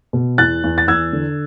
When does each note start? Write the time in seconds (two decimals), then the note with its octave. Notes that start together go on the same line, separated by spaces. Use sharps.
0.13 B2
0.38 E2 F#6 A6
0.64 E2
0.78 A6
0.88 E2 E6 G#6
1.13 D3